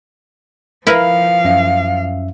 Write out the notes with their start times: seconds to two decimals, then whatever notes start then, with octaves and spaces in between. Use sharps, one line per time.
0.87 F3 E4 A#4 B4 F5
1.45 F#2 C#4 E5